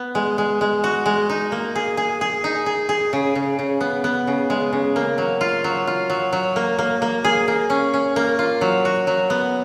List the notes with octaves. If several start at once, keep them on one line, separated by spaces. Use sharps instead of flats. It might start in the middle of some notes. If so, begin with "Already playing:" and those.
Already playing: B3
G#3
G#3
G#3
F#4
G#3
D#4
A#3
G#4
G#4
G#4
D#4
G#4
G#4
C#3
C#3
C#3
B3
B3
C#3
G#3
C#3
A#3
F#3
F4
F#3
F4
F#3
F#3
A#3
A#3
A#3
G#4
A#3
C#4
C#4
A#3
F4
F#3
F#4
F#3
B3